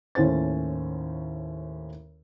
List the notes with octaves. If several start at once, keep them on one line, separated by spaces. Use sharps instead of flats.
D#2 A2 C#4 A4 C5 A6